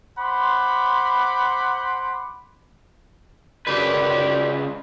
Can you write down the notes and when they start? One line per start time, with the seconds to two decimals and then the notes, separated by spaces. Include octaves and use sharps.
0.19 C5 F#5 B5 C6 D6
3.67 C#2 F#2 D#3 G4 B4 D5